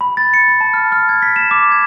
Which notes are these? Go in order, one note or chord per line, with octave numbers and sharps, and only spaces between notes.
B5
A6
C#7
B5
A5
F6
F6
G#6
B6
E7
D6
G#6